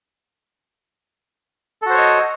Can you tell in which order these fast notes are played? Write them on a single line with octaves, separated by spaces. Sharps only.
A4 F#4 C5 C#5 D#5